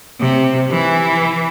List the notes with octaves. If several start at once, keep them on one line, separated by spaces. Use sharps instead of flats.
C3
E3